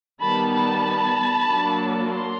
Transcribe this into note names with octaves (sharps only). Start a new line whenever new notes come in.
D#3 G3 B3 A5 B5
A5 B5
F#3 A#3 D4
A#5 C6